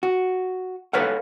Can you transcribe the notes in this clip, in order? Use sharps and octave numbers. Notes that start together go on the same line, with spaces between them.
F#4
A4 B4 C#5 F5 F#5